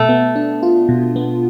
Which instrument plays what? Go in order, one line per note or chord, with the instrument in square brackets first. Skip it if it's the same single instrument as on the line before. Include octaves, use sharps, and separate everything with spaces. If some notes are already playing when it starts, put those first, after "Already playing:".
Already playing: [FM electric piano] B2 [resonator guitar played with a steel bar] A3
[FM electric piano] B3
D4
F4
B2
B3